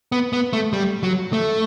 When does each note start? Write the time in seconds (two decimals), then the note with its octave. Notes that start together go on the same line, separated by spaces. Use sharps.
0.12 B3
0.33 B3
0.53 A3
0.73 G3
1.03 F#3
1.33 A3